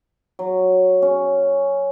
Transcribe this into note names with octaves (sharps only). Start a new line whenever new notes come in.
F#3
C#4